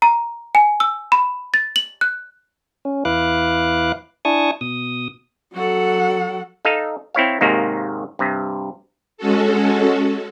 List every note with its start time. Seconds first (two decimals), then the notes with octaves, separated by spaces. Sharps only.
0.02 A#5
0.55 G#5
0.80 E6
1.12 B5
1.54 A6
1.76 F#7
2.01 F#6
2.85 C#4
3.05 E2 E4 B4 F5 D6 F#6
4.25 D4 E4 G#5 A5 C#6 D#6
4.61 B2 D#6
5.54 F#3 F#4 A4 F#5
6.65 D#4 A4 D#5 F5
7.15 C4 E4 C#5 F5
7.41 D#2 G#2 C3 D#3 A#3
8.19 G2 C3
9.18 G#3 C#4 F#4 A4